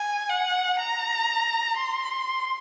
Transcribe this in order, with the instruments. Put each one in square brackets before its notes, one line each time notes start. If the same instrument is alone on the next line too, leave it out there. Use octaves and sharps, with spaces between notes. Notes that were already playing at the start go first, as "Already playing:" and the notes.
Already playing: [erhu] G#5
F#5
A#5
C6